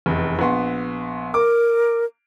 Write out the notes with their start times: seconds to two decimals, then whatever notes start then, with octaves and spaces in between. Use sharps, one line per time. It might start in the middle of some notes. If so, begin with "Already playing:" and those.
0.06 F1 E2
0.39 A#1 B3 C6
1.34 A#4 D6